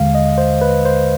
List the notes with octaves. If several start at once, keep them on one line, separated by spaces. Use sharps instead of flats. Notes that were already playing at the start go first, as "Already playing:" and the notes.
Already playing: D#2 D3 G#3 F5
D#5
C5
B4
C5